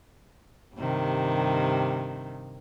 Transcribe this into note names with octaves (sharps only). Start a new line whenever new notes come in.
G2 C3 D#3